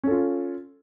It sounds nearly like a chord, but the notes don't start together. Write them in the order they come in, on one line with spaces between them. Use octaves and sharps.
C#4 A4 F4